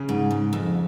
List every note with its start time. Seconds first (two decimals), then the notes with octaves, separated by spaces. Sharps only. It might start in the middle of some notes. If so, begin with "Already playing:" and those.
Already playing: C#3
0.09 G#2
0.31 G#2
0.53 F2